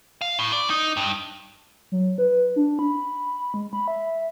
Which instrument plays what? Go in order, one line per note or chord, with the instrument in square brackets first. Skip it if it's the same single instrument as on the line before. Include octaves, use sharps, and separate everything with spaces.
[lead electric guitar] F5
A2
D5
D#4
G2
[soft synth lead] F#3
B4
D4
B5
G#3
B5
E5